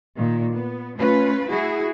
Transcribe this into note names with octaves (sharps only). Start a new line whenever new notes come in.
A#2 D#3
B3
A3 C#4 F4 B4
E4 F#4 G#4